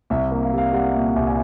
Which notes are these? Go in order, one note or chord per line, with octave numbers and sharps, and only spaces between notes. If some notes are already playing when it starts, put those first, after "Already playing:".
C2 E5
A#3
F5
G3 F5
G3 F#5
A#2
C2
G#5